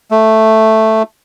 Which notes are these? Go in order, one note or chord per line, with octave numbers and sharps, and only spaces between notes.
A3